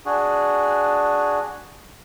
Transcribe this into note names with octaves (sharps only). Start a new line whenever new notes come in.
D4 F#4 G#4